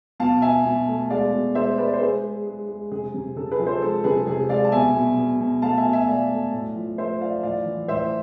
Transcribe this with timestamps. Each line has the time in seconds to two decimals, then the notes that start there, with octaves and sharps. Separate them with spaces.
0.20 B2 F5 A5
0.42 B2 E5 G#5
0.65 B2
0.88 A3
1.10 G#3 D5 F5
1.33 B2
1.55 G#3 C5 E5
1.78 G#3 B4 D5
1.93 C5
2.01 G#3 G#4 B4
2.23 G#3
2.46 G#3
2.68 G#3
2.91 C3 G#4
3.14 C3
3.36 C3 A4
3.51 G#4 B4
3.59 F3
3.66 A4 C5
3.82 G#3 A4
4.04 C3 G#4 B4
4.27 C3 G#4
4.49 G#3 D5 F5
4.65 A5
4.72 B2 E5 G#5
4.95 B2
5.17 B2
5.40 B2
5.62 A3 F5 A5
5.77 E5 G#5
5.85 B2
5.93 E5 G#5
6.07 A3 D5 F5
6.31 A3
6.53 A2
6.76 F3
6.98 A3 C5 E5
7.21 F3 D5 F5
7.43 A2 D5 F5
7.66 E3
7.88 A2 C5 E5